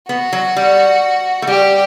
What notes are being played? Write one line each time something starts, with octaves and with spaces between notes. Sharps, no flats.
B3 F#4
F#3
G3
A3
G3 G4